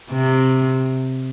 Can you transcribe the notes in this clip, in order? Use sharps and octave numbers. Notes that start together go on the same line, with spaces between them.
C3